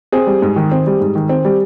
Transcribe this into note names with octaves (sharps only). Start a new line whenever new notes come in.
C4 G#4
G3
G#2
D#3
C4
G3
G#2
D#3
C4
G3